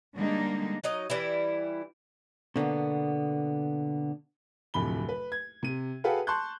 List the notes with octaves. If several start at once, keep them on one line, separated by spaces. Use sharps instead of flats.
D3 G3 G#3 A#3 D4 D#4
F#3 D#4 D#5
E3 G3 E4
B2 D3 A#3 B3
D1 F2 C3 B5 G7
B4
G#6
C3 D#7
F#4 G#4 A4 B4 F5 G5
A5 C6 C#6 F#6 G6